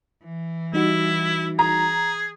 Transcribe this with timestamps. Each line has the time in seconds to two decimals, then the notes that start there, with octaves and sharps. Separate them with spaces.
0.24 E3
0.73 G3 D#4 E4 F#4
1.59 G#4 A#5